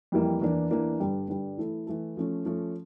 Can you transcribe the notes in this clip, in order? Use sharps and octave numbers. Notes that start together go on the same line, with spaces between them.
F2 E3 G3 A#3 E4
E2 E3 A#3 D4
E2 E3 A#3 D4
G2 D3 G3 D4
G2 D3 G3 D4
E3 A3 E4 A4
E3 A3 E4 A4
F3 A3 C#4
F3 A3 C#4